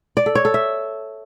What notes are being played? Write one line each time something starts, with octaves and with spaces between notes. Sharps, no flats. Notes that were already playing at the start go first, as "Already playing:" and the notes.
D5
A4
C#5
A4
E5